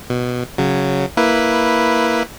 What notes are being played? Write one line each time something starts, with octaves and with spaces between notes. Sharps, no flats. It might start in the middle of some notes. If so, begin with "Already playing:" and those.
B2
C#3 F#3
A#3 E4 B4